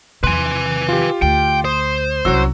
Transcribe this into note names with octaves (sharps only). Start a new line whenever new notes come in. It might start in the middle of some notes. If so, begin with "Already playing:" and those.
E2 C3 B4 G#5 C6
F4 G4
D2 G5
C5 D#6
C2 F#3 C#4 F#4 E6